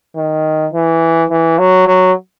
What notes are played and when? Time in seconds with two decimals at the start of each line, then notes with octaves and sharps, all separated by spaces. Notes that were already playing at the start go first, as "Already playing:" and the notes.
0.16 D#3
0.73 E3
1.30 E3
1.59 F#3
1.87 F#3